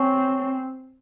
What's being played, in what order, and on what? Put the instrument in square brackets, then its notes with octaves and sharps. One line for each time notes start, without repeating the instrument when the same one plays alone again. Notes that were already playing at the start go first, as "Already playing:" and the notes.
Already playing: [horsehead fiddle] C4 [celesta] C#5 G#5 C#6